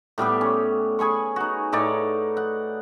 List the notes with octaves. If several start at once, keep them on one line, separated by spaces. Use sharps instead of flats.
A2 G3 B3 G4
C#4
G#4 G#5 B5 C#6
D#4 F#4
A2 D#4 C#5 D5
F#5